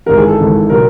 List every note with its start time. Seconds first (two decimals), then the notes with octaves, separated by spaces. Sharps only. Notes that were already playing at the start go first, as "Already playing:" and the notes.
0.06 G#1 G#2 E3 A#4
0.17 G#4
0.28 A4
0.39 G#1 G#2 E3
0.70 B2 F#3 A#4